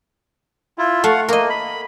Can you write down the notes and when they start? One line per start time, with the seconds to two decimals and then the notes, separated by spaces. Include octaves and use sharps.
0.78 E4 F4
1.04 A3 F5 F#5
1.29 A#3 A#4 D#5
1.50 B5